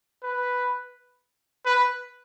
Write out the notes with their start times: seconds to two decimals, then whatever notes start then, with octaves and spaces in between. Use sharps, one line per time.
0.23 B4
1.66 B4